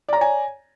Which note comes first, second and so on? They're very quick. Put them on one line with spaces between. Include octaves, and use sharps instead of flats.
D5 A#5 C#5 G#5